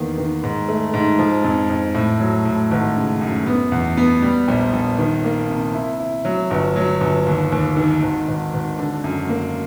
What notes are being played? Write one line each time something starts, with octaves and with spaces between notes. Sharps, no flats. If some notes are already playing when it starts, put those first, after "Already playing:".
Already playing: E2 D#3 A#3
D#3
G#2
A3
G#2
F3
F2
F2
A2
F#3
A2
G#1
C#3
F#2
B3
E2
B3
G3
A#1
A#1
D#3
A#3
C3
E4
E4
F#3
G1
F#3
G1
D#2
D#2
D#3
G#1
G#1
G#1
D3
F#2
A#3